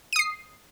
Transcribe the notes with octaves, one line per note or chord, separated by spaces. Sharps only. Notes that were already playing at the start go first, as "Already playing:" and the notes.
D#6 C7 D#7